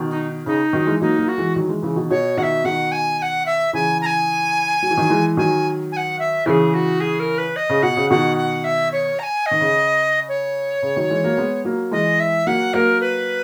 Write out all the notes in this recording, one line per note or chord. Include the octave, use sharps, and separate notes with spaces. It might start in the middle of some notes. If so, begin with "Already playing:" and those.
Already playing: B2 D#3
D#4
C#3 D#4
D#3 F#3
E3 G#3
F#3 A#3 D#4
F#3 A#3
F#4
E3 G#3
D#3 F#3
E3 G#3
C#3 E3
B2 D#3
B2 C#5
B2 D#3 F#5
E5
B2 D#3 F#5
G#5
G#5
F#5
E5
C#3 E3 G#5
A#5
G#5
F#3
E3
D#3 F#3
E3 G#3
D#3 F#3 G#5
G#5
F#5
E5
C#3 E3 G#4 A#4
F#4
G#4
A#4
B4
D#5
C#3
B2 F#5
C#3
B2 D#3 F#5
F#5
E5
C#5
A#5
G#5
D#5
D#3
C#3
C#5
C#3
D#3 F#3
E3 G#3
F#3 A#3
G#3 B3
F#3 A#3
E3 G#3 D#5
E5
F#3 A#3 F#5
F#3 A#3 A#4
B4